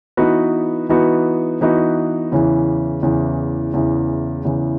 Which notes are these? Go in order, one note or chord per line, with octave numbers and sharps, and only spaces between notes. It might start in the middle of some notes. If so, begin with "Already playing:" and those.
E3 B3 D#4 F#4 B4
E3 B3 D#4 F#4 B4
E3 B3 D#4 F#4 B4
E2 C#3 E3
E2 C#3 E3
E2 C#3 E3
E2 C#3 E3